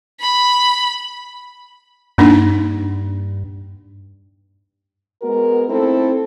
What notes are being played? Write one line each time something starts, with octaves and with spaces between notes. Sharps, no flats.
B5
G2 A#3 D4 D#4
G#3 B3 F#4 A#4
A3 C4 D#4 E4 A4